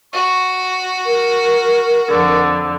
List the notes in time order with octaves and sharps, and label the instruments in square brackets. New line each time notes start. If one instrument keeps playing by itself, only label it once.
[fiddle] F#4 [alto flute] C#6
[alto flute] A#4
[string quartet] F2 D3